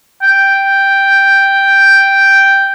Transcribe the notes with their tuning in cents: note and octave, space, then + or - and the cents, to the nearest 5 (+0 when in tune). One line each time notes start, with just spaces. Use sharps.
G5 +0